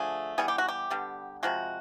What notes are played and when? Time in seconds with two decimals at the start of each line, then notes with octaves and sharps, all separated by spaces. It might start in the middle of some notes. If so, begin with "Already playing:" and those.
Already playing: D3 F3 A3 G#4
0.38 E3 G3 B3 G#4
0.48 G4
0.58 F#4
0.69 G4
0.90 D3 G3 B3
1.43 C3 F3 G#3 F#4